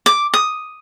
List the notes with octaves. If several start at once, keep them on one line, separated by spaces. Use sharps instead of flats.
D6
D#6